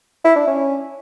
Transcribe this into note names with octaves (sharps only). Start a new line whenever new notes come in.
E4
D4
C#4